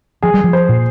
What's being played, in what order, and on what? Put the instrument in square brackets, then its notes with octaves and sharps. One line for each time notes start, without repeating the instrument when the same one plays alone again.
[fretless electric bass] F3 [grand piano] G#4
[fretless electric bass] G3
F3
[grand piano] C5
[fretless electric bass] A#2